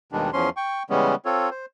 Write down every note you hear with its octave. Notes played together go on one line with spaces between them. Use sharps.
D#2 B2 D#3 G3 G#3 D4
E2 F3 C#4 C6
G5 C#6
C#3 E3 G3 G#3 B3 C#4
C4 F4 A4 C#5
C5